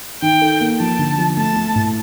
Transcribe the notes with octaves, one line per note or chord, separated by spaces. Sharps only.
D#3 G5
A4
A#3
F3 A5
D3
F3
A3 A5
A3
A2